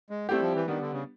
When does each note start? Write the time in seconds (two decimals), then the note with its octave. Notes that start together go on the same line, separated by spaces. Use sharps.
0.10 G#3
0.29 G3 A3 C4 E4 G4
0.41 F3
0.55 E3
0.67 D#3 G3 B3 D4
0.81 D3
0.92 C#3